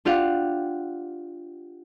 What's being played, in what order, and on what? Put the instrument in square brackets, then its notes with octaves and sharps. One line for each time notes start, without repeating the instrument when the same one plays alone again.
[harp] D4 F4 G4 F5 F#5